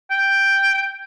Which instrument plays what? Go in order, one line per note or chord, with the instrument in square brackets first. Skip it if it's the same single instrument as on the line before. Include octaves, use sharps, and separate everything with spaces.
[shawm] G5